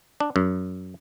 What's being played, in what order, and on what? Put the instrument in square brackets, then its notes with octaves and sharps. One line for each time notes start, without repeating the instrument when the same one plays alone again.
[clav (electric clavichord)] D4
F#2